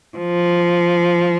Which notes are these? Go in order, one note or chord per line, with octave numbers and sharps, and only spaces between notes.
F3